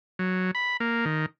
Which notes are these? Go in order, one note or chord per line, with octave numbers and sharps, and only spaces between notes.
F#3
B5
A#3
D#3